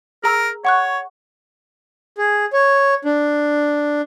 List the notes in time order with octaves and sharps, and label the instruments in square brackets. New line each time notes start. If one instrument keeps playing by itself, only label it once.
[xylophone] G#4 A#5 E6 [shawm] A#4
[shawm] C#5 [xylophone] F#5 C#6 F#6
[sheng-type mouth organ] G#4
C#5
D4